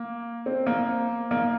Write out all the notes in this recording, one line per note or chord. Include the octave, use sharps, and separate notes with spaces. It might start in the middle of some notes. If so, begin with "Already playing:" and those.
Already playing: A#3
C4
A#3
A#3